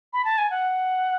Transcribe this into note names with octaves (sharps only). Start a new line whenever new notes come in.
B5
A5
G#5
F#5